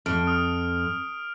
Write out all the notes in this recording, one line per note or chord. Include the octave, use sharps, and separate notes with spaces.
F2 F6 D7
D#6 F6